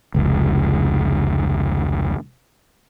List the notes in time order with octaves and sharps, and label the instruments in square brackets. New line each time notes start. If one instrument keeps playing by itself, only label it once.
[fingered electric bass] F1 C#2